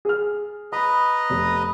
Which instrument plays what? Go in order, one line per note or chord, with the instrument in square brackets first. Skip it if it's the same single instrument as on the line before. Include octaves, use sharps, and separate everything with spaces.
[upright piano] G#4 F6
[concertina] B4 D#5 A#5 [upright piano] B5
[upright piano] F1